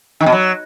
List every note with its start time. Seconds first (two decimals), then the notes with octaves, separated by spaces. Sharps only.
0.20 D#3
0.26 B2
0.32 F#3